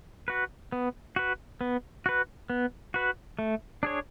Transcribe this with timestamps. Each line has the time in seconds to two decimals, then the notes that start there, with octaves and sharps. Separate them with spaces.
0.28 F#4 B4
0.72 B3
1.16 F#4 B4
1.61 B3
2.06 F#4 B4
2.50 B3
2.94 F#4 B4
3.39 A3
3.83 D4 G#4 C#5